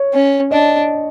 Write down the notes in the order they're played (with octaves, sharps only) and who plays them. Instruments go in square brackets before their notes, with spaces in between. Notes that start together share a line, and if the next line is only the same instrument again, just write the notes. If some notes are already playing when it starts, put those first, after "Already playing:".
Already playing: [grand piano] C#5
[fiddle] C#4
[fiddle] D4 [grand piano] D#5